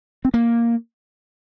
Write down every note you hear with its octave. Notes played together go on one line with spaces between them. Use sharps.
C4
A#3